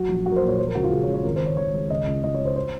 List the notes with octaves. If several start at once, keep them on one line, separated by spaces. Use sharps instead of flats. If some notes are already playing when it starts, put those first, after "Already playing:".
Already playing: F#3 F#4
A#1
F#3 F#4
A#4
C5
A#2
C#5
F3 C5
A#4
C#2 F#4
F4
C#2 G#4
C#5
C#2
C#5
G#1 A#4
C5
G#1 C#5
G#1 C#5
G#3
C#2 D#5
C#2
C#2 D#5
C#5
C#2
C5
C5